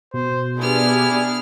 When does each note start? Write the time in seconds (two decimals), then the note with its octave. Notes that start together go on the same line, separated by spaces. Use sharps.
0.14 B2 C5
0.58 B3 D4 E4 G4 G#4 F6